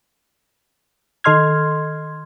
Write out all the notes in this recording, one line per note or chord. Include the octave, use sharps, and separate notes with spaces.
D#3 A4 D#5 C6 F6 G#6